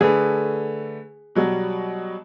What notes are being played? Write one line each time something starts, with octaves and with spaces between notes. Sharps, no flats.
D3 A3 G#4 B4
B2 F#3 G3